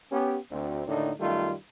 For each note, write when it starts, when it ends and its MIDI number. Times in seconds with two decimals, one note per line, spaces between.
0.11 0.37 59
0.11 0.37 61
0.11 0.37 67
0.51 0.82 38
0.51 0.82 60
0.87 1.11 39
0.87 1.11 45
0.87 1.11 50
0.87 1.11 51
0.87 1.11 62
0.87 1.11 63
1.20 1.53 42
1.20 1.53 51
1.20 1.53 55
1.20 1.53 57
1.20 1.53 65